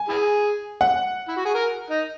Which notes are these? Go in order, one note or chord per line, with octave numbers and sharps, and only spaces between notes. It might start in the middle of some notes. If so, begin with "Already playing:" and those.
Already playing: G#5
E4 G#4
F#5
E4
F#4
G#4
A#4
D#4